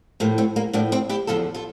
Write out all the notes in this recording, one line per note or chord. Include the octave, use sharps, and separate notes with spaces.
A2 F3 A#3
A3 C4
A#3
A2 F3 A#3 D4
C4 E4
E4 G4
E2 D3 F3 F4 A4
F4 A4